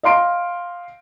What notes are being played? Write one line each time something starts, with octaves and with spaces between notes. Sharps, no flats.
D#5 F5 C6 D7